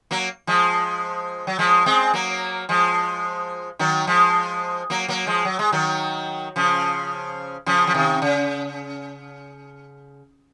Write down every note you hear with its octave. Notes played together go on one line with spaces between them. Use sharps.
F#3 A#3
F3 G#3
F#3
F3 G#3
G#3 C4
F#3 A#3
F3 G#3
D#3 F#3
F3 G#3
F#3 A#3
F#3 A#3
F3 G#3
F#3
G#3
D#3 F#3
C#3 F3
C#3 F3
F3
C3 D#3
C#3